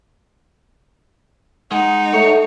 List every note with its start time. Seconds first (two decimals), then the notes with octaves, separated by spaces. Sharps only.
1.71 G#3 D#4 F#5
2.14 A3 C#5